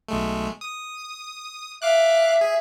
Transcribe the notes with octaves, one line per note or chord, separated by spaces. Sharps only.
B1 G#3 A3
D#6
E5 F5 D6 F#6
G#4